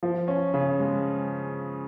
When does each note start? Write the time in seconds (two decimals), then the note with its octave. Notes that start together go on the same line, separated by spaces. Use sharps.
0.03 F3
0.28 C#4
0.54 C#3
0.79 G#3